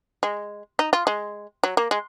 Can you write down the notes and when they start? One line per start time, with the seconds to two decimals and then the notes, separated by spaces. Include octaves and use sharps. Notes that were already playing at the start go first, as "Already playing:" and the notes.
0.23 G#3
0.79 D#4
0.93 F4
1.07 G#3
1.63 F#3
1.77 A#3
1.91 G#3